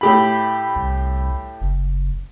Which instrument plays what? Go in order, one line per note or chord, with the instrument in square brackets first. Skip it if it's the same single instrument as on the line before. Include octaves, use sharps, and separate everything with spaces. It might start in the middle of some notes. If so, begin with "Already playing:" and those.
[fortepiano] A2 G4 B5
[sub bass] C2
F#1